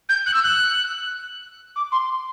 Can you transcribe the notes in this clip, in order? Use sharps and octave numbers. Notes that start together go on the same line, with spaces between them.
G6
F#6
E6
F#6
D6
C6